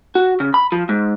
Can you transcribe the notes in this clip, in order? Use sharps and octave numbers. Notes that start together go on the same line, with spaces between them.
F#4
C#3
B5
F3
G#2